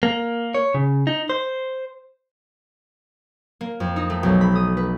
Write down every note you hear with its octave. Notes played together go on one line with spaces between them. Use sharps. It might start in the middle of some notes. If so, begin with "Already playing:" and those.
A#3
C#5
C#3
D#4
C5
A#3
F2
D#4
A3
B1
B5
D#6
B4